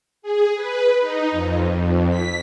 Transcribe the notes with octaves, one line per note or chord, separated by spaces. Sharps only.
G#4
B4
D#4
F2
F2
B6